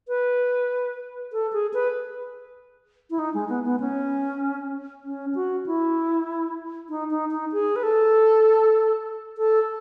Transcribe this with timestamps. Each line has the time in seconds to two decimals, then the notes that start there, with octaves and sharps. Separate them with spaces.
0.08 B4
1.33 A4
1.53 G#4
1.74 B4
3.10 E4
3.19 D#4
3.34 G#3
3.49 B3
3.65 B3
3.80 C#4
5.04 C#4
5.35 F#4
5.66 E4
6.90 D#4
7.11 D#4
7.31 D#4
7.52 G#4
7.76 B4
7.83 A4
9.38 A4